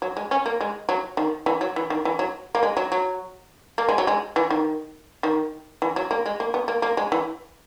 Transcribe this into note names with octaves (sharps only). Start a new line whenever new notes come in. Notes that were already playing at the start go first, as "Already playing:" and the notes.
F#3
G#3
C#4
A#3
G#3
F#3
D#3
E3
F#3
E3
D#3
E3
F#3
A#3
G#3
F#3
F#3
A#3
G#3
F#3
G#3
E3
D#3
D#3
E3
F#3
A#3
G#3
A#3
B3
A#3
A#3
G#3
E3